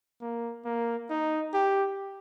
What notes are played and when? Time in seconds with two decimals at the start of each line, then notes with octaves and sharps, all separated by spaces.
0.21 A#3
0.65 A#3
1.10 D#4
1.54 G4